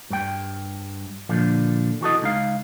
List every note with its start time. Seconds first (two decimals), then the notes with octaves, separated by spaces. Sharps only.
0.10 G2 G5
1.29 A#2 D3 F3
2.01 E3 F#4 A4 D#5
2.22 C#2 D#4 F5